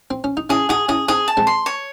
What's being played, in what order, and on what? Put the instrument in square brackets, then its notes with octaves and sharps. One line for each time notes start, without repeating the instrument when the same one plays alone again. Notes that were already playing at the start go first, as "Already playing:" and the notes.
[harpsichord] C4
C#4
D#4
[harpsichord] C#4 E4 [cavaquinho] G#4
[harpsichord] D#4 F#4 [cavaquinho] G#4
[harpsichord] C#4 E4 [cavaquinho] G#4
[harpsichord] C4 D#4 [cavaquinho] G#4
[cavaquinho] A5
[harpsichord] G#3 C4
[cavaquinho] C6
C#5